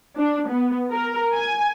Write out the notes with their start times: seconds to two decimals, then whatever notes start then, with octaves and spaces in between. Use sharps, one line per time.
0.17 D4
0.50 B3
0.91 A#4
1.33 G#5